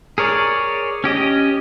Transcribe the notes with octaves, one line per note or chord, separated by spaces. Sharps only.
G#4 A#4 C#5 D5
C#4 G4 D#5